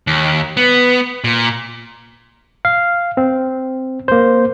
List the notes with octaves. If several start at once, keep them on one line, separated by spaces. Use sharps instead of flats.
D#2
B3
A#2
F5
C4
A#3 C5